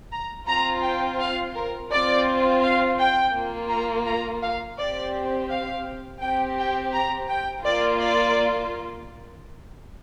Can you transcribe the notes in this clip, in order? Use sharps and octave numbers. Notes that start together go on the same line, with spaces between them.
A#5
C4 F4 A#5
G5
F5
A#4
C4 F4 D5
F5
G5
A#3 F4
A#5
A#5
F5
C4 G4 D5
F5
C4 G4 G5
G5
A#5
G5
A#3 F4 D5
D5